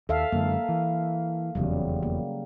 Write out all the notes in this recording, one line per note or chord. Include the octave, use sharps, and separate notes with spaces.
D#2 A4 E5 F5
F#2 D3 G#3 A#3
E3
F1 E2 C#3 F#3 G3
A#3